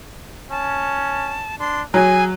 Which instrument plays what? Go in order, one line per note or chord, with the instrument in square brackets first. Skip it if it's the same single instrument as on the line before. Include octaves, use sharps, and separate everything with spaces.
[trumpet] C#4 [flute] A5
[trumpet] D4 [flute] C6
[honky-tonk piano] F#3 [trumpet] G#4 [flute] G#5